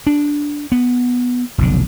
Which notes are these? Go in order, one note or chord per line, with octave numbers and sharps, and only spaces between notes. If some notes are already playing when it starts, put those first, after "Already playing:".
D4
B3
F1 B1 D3